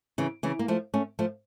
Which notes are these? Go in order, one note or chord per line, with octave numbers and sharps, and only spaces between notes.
C#3 E3
C#3 E3
A#3
F3 A3
A3 C#4
F3 A3